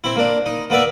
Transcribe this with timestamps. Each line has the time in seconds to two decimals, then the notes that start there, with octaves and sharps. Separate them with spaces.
0.04 C4 E4
0.16 A#3 D4
0.46 D#4
0.70 A#3 B3 D5 E5